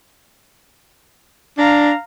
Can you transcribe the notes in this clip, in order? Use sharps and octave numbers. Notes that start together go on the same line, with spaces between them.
D4 F5 A#5